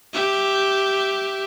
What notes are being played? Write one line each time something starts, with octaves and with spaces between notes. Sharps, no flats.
G4 E5